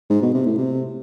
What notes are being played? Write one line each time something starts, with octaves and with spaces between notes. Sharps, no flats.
G#2
B2
C3
A2
C3